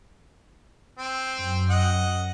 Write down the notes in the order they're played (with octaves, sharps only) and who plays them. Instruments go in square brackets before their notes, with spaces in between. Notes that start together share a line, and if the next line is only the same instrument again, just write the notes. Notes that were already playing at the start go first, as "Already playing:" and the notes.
[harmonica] C4
[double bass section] F#2
[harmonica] D#5 F#5